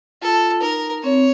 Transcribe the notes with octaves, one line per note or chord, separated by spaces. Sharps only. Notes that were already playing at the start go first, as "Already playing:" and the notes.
F4 A4
D#4 A#4
C4 C#5